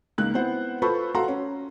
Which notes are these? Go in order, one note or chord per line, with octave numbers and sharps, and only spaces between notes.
C#2 A#3 D#4 F#6
B3 C4 E4 C5 F#5
F4 A4 B4 C5 B5 C#6
F#4 A4 F5 F#5 A#5 C6
C#4